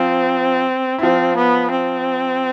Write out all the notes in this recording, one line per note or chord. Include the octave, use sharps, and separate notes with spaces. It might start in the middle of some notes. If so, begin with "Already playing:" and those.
Already playing: F3 C4 F4
E4
F3 C4 F4
B3
C4